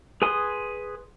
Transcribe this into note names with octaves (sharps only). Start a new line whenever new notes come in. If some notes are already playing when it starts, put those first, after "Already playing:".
G#4 B4 G#5 C6 D#6